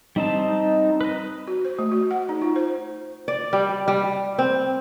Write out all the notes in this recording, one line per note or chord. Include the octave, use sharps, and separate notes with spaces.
G3 C4 D#4 A5
B4 D#5
F#4
C5
A3
F#4
F#5
D#4
F4
C5
D5
G3
G3
C4